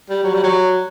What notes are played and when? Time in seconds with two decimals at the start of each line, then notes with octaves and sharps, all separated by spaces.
0.09 G3
0.24 F#3
0.34 G3
0.43 F#3